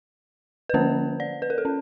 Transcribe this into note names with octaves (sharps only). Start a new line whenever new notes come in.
B4
D3 F3 A#3 C#4 C5
D5
B4
A#4
A4
C#4